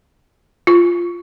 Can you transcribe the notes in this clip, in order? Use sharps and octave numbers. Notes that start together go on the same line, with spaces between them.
F4